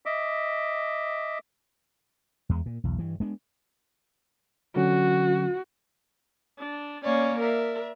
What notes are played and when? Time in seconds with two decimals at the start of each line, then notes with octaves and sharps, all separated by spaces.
0.06 D#5 E5 D6
2.49 E2 G#3
2.66 A#2
2.84 B1 E2
2.98 G2 E3
3.20 G#3 B3 D4
4.76 D3 F#3 C#4 F#4
6.59 D4
7.04 A#3 C#4 C#5 D5
7.39 A#4 D5 E5